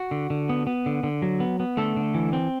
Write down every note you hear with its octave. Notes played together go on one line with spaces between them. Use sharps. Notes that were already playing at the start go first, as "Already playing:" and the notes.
Already playing: F#4
D3
D3
B3
B3
D3
D3
F#3
B3
B3
D3 A3 A4
D3
E3
C4